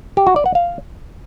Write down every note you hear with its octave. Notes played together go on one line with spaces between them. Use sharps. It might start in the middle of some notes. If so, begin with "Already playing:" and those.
G4
F#4
D5
F#5
F5